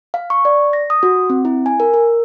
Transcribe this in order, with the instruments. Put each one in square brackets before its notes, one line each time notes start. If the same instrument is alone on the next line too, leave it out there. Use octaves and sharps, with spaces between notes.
[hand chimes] F5
C#6
D5
A#6
D#6
F#4
C4
E4
G#5
A#4
A#4